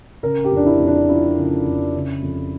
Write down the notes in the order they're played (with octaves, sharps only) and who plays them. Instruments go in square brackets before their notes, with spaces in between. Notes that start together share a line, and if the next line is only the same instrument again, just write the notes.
[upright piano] C#3 A#4
G4
F2
D4
E4
F2
D4
F3 E4
C#3
F2
C#3
F2